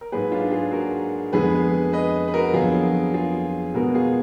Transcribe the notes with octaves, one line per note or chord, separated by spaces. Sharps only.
A#4
G#2 F#3 A#3 G#4 B4
D4 F4
F4 G#4
F#4 A#4
F2 D3 G#3 B3 G#4 B4
B4 D#5
B4
F#4 A#4
F2 D3 F#3 B3 F4 G#4
F4 G#4
B2 G#3 B3 F#4 A#4
F4 G#4